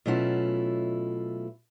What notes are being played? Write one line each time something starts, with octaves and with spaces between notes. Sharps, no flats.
B2 F#3 A3 C#4 E4 F4